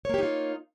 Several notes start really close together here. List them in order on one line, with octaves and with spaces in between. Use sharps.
C#5 A#3 G4 D#4 F4